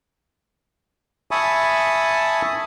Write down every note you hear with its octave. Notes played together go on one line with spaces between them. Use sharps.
E5 G#5 A5 B5 C#6 D#6